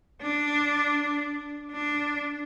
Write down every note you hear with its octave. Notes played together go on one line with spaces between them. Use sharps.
D4
D4